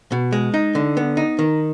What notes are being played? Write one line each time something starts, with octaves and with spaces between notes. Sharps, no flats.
B2
G#3
D#4
D3
B3
D#4
D#3